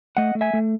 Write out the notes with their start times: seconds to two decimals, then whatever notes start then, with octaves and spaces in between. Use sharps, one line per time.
0.17 A3 D#5 F#5
0.35 A3
0.41 E5 G#5
0.53 A3